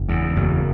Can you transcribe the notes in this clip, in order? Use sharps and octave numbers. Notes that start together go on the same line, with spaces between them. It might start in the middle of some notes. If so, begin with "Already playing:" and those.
Already playing: F#1
E2
F#1